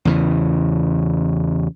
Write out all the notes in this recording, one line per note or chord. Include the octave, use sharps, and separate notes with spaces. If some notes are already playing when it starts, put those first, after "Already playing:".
E2 C#3 E3